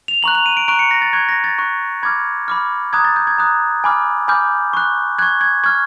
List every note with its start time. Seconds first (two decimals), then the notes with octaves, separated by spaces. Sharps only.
0.08 F7
0.23 A#5 C#6 F#6 F#7
0.35 F7
0.46 D#7
0.57 D7
0.68 A#5 C#6 F#6 D7
0.79 C#7
0.91 A#6
1.02 A6
1.13 C#6 F#6 G#6
1.29 A#6
1.44 A6
1.59 C#6 F#6
2.03 B5 D6 F6 G#6
2.48 B5 D6 F6
2.93 A#5 D#6 F#6 G#6
3.05 A6
3.16 G6
3.27 G#6
3.38 A#5 D#6 F#6
3.84 G#5 B5 D6 F6
4.28 G#5 B5 D6 F6 G6
4.73 C#6 F#6
5.18 C#6 F#6 G#6
5.41 G#6
5.64 C#6 F6 G#6